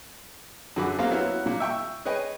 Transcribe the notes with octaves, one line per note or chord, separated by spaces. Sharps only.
F#2 D3 F#4 G#4 B5 D6
F#3 A3 A#3 C4 G4 F5
F#3 B3 C#4 E4 F#4
A#2
E5 G5 C#6
G#4 B4 C#5 D#5 G5